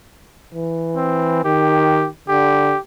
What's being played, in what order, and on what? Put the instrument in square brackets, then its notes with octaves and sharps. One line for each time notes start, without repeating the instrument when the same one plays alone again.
[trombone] E3
[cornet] C4
[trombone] D#3 [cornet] G4
[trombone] D3 [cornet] G4